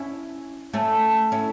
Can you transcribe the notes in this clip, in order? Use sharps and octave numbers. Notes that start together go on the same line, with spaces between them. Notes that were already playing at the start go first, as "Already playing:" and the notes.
Already playing: C#4 E4
A3 C#4
C#4 E4